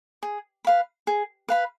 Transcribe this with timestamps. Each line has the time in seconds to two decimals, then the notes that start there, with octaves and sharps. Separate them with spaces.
0.23 G#4
0.65 B4 F5 B5
1.07 G#4
1.49 B4 F5 B5